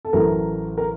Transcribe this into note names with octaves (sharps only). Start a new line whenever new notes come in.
A4
A1 A2 F#3 A3 A#4
A#4